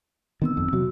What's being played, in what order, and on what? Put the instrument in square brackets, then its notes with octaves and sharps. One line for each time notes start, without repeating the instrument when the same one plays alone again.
[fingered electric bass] D#3 B3 [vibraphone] C4 E6
[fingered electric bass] G1 F2
[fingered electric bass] C3 F#3 [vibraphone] F#4